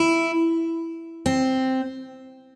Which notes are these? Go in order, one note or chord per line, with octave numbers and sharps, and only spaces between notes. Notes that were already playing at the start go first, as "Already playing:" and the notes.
Already playing: E4
C4